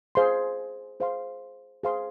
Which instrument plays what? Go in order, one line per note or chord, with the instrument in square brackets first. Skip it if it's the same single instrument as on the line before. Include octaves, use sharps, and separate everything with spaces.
[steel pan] G#4 C5 F5 C6
G#4 C5 F5 C6
G#4 C5 F5 C6